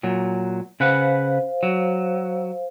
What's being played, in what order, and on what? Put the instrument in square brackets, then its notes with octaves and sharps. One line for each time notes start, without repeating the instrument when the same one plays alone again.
[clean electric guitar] A#2 F#3
[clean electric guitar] C#3 B4 F#5 [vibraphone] C5 F5
[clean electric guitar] F#3